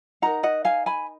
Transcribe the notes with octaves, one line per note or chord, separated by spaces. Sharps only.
D#4 A#4 F#5 A#5
D#5 F#5
F5 G#5
G#5 B5